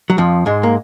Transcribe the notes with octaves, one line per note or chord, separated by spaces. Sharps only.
F#3
F2 F3
G#2 G#3
A#3